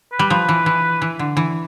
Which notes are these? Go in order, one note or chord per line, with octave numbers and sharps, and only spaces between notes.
B4
G3
F3
E3
E3
E3
D3
E3